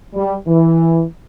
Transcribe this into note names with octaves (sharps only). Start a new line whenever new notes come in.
G3
E3